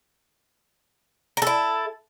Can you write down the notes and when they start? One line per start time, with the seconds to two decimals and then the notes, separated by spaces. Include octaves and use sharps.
1.37 A#4
1.42 A4
1.47 E4